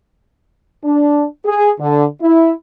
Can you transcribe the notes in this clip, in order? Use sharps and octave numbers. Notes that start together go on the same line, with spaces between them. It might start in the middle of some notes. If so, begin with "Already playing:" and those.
D4
G#4
D3
E4